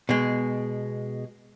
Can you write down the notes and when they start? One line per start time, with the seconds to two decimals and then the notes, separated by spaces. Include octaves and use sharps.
0.09 B2 G#3